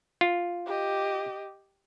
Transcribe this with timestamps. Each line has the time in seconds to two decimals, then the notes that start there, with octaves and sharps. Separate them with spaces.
0.21 F4
0.66 G4 D#5